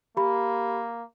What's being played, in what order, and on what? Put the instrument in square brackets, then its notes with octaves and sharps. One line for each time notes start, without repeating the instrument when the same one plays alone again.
[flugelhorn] A#3 [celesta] G4 B5